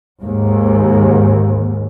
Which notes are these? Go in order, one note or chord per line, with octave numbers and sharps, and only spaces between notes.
D#2 G#2